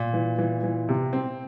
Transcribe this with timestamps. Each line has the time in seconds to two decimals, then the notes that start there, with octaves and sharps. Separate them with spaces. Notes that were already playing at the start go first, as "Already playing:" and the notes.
Already playing: A#2
0.13 E3
0.38 E3
0.63 E3
0.89 C3
1.13 C4